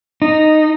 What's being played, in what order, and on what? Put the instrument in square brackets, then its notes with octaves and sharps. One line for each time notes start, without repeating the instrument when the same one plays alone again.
[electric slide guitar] D#4